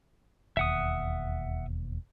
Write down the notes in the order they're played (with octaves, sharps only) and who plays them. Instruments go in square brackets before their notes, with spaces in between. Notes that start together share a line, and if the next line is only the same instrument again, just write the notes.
[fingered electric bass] E1 D#2 [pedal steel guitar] E5 F#5 D#6